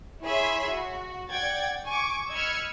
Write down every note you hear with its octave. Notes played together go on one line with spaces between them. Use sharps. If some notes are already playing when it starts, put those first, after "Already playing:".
E4 G#4 C#5 E5 B5 C6
F#4
D5 F#5 G5 G#6 A6
G#5 C#6 D6
D#5 B5 E6 F6 G#6 C#7